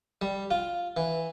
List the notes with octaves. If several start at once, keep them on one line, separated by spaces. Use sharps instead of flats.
G3
F4
E3